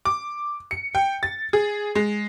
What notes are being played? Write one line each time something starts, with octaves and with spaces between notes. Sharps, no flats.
D6
C#7
G5
A6
G#4
G#3